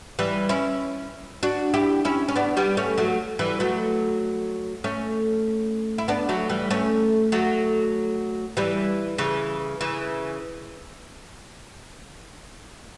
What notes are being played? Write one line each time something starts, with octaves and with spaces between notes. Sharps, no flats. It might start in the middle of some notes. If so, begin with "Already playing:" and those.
E3 G3
C#4 E4
D4 F#4
E4 G4
C#4 E4
C#4
B3 D4
G3 B3
A3 C#4
F#3 A3
E3 G3
F#3 A3
A3 C#4
E4
B3 D4
F#3 A3
E3 G3
A3 C#4
F#3 A3
E3 G3
C#3 E3
C#3 E3